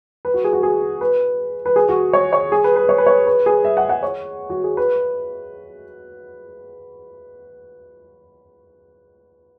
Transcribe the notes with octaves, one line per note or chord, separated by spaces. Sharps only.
B4
F#4
G#4
F#4
G#4
B4
B4
G#4
F#4
C#5
C#5
G#4
B4
B4
C#5
B4
C#5
B4
G#4
E5
F#5
F#5
C#5
F#4
G#4
B4